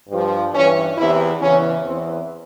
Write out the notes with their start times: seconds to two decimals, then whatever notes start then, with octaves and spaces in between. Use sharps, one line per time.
0.08 G2 F3
0.52 G2 E3 C#4
0.96 E2 C3 E3 E4
1.40 E2 C#3 E3 C#4
1.84 E2 E3 C4